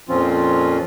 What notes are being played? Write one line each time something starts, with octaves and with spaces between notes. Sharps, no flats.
F2 A#2 F3 C4 C#4 F4